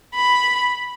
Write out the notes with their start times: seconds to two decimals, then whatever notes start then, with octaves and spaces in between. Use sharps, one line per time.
0.15 B5